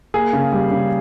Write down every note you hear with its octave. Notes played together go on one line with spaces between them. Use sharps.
A#3 G#4
C#3
G3
C#3